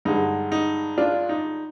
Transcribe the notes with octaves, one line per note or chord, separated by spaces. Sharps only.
G2 D3 G#3 D#4
D#4
D4 F4
D#4